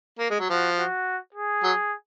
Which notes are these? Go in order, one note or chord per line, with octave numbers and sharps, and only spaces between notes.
A#3
G#3
F#3
F3 F#4
F#4
G#4
F#3